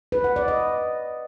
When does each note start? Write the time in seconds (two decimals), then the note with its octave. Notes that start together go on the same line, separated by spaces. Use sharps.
0.12 B4
0.24 F#5
0.36 D5
0.48 D#5